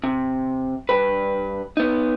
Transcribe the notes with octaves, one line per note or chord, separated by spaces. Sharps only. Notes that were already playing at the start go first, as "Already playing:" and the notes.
C3
G2 B4
B3 D#4